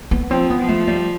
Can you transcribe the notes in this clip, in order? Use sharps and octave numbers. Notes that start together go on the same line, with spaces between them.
B3
F3 C4
B3
F3
A3
G3